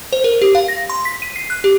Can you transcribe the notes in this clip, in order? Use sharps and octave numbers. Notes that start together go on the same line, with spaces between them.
C5
A#4
G4
F5
A#6
C6
B6
D#7
C7
F#6
G4